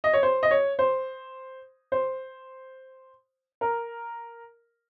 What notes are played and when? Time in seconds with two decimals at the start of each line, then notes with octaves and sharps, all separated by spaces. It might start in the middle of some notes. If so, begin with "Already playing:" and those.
0.04 D#5
0.13 C#5
0.23 C5
0.43 D#5
0.51 C#5
0.79 C5
1.92 C5
3.61 A#4